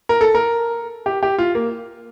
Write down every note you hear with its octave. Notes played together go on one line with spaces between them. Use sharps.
A#4
A4
A#4
G4
G4
F4
A#3